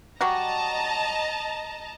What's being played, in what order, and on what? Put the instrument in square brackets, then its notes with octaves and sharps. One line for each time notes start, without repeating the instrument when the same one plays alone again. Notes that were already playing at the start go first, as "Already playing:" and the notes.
[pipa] F#3 G3 F#4 [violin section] D#5 A5 A#5